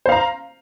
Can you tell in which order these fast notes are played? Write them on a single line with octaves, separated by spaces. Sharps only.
C5 F5 A#5